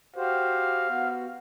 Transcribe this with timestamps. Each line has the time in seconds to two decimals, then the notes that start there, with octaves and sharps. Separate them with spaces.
0.16 F#4 G4 C5 F5
0.88 B3 F#4